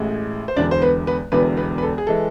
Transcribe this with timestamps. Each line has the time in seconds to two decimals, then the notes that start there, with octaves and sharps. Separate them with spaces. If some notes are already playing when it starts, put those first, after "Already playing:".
Already playing: A1 A2 G#3
0.48 C5
0.56 E1 E2 D3 D4 D5
0.71 C5
0.82 B3 B4
1.07 B3 B4
1.32 E1 E2 D3 B3 B4
1.57 B3 B4
1.78 B4
1.82 A4
1.98 G#4
2.07 E3 G#3 A4